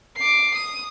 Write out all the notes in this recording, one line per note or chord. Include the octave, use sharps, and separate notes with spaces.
D6 C7
D#6